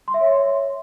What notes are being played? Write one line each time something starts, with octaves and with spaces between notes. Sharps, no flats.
C6
E5
C#5